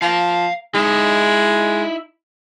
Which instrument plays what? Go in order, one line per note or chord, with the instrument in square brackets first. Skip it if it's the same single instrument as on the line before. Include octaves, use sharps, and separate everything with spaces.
[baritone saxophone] F3 [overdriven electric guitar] F5 A#5
[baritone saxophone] G#3 [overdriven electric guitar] D#4 E4